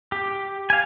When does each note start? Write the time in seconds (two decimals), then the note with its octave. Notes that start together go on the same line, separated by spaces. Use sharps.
0.12 G4
0.70 F5 G#5